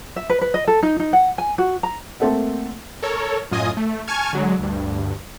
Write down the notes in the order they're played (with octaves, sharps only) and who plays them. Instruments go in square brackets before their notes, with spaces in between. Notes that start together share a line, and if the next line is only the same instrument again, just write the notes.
[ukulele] E5
B4
B4
D#5
A4
D#4
D#4
F#5
G#5
F#4
A#5
[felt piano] A3 A#3 C4 A4 E5 F#5
[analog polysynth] A4 A#4 C#5
F#2 A2 F4 D#5 G#5 D#6
A3
G#5 A5 C#6 F6 G#6
D3 F#3 G#3
D2 G2